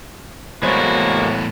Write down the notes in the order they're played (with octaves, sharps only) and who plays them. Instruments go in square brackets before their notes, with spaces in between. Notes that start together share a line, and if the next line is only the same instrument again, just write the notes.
[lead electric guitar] E2 A2 [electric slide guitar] G#3 A#3 [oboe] F#4 [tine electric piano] C5 C#5 B5